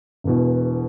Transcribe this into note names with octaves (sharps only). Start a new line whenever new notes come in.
E1 E2 B2